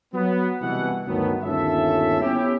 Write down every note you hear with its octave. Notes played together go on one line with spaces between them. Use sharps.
F#3 B3
C2 B2 E3 F#5
D2 G2 D#3 F#3 A3 B3
G1 D#2 C#4 F4 A4 E5
B3 C#4 E4 G4